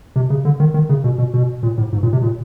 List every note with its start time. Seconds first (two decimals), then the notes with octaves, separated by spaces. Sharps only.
0.16 C3
0.30 C#3
0.45 D3
0.60 D#3
0.74 D#3
0.89 C#3
1.04 B2
1.18 B2
1.34 B2
1.63 A#2
1.78 A2
1.93 G#2
2.03 A#2
2.13 C3
2.22 A#2